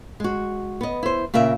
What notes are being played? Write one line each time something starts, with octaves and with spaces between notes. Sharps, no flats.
G#3 F#4
B3 D#5
E4 C5
A#2 C#3 A#4 E5